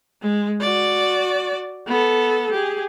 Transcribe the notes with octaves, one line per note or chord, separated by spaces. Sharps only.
G#3
F#4 D5
B3 A4
G4 G#4